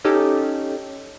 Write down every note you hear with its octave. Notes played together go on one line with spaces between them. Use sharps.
C#4 D#4 G4 A4